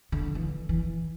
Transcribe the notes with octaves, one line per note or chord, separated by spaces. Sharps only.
D3
E3
E3